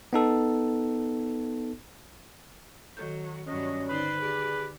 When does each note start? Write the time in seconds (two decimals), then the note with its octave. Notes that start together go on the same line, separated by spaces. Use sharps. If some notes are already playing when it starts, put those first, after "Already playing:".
0.13 B3 D#4 A4
2.97 D#3 F#3 A4 G6
3.47 G2 F#3 C#4 D#5
3.89 D3 D#4 B4 C5 D5
4.21 G4 G#4 D5